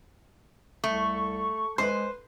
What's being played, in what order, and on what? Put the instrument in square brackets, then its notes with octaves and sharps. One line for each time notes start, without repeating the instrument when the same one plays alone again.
[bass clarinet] C2 [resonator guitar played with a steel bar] A3 [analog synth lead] C#6
[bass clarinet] G#3 [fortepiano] B4 C6 [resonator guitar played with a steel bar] C5